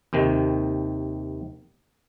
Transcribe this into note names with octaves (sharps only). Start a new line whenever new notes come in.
D#2 C3 D#3